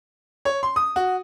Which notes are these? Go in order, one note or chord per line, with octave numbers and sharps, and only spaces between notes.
C#5
C6
D#6
F#4